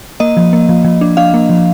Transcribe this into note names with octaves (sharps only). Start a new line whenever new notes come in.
A#3 D#5
F3
A#3
F3
F3
D4
D4 F5
A#3
F3